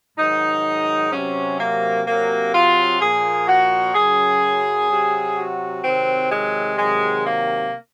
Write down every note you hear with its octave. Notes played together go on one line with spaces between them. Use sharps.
G#2 D#3 F#3 D#4
C3 F#3 C#4
A#3
C3 F#3 A#3
F4
A#2 F3 G#4
F#4
F#2 C#3 F#3 G#4
C3 F#3
F#4
C3 D#3 F#3 C4
G#3
C3 D#3 F#3 G#3
A#3